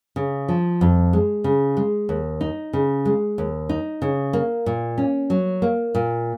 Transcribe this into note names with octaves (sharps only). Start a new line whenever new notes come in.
C#3
F3
F2
G#3
C#3
G#3
D#2
D#4
C#3
G#3
D#2
D#4
C#3
A#3
A#2
C#4
F#3
A#3
A#2